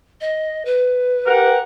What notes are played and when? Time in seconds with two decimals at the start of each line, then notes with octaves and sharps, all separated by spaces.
0.21 D#5
0.65 B4
1.27 G4 A#4 F#5